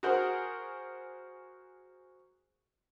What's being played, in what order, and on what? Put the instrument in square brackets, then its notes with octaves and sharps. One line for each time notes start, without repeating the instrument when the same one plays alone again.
[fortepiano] F#4 G#4 A#4 C5 F#5